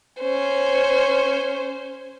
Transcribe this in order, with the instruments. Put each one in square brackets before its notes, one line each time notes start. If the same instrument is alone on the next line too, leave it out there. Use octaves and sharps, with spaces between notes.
[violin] C#4 C5